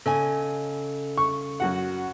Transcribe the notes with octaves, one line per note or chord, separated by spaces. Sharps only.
C#3 A4 D#5 G#5
C#6
F#2 F#4 F#5